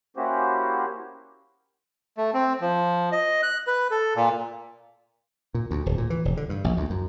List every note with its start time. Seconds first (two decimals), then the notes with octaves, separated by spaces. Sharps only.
0.17 A#3 C#4 E4 F#4 G4 C5
2.18 A3
2.34 C4
2.61 F3
3.12 D#5
3.43 F#6
3.67 B4
3.91 A4
4.16 A#2
5.54 A#2
5.71 D2
5.86 D1
5.98 A#2
6.10 E3
6.25 E1
6.37 D3
6.49 G2
6.64 A#1
6.77 D2
6.90 F#2